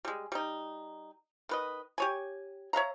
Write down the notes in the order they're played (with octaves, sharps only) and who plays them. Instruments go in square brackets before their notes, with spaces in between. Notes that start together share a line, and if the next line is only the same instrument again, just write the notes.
[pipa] G3 G#3
G3 D#4
D#3 B4 D#5
G4 C#5 G#5
C#5 E5 F5 A#5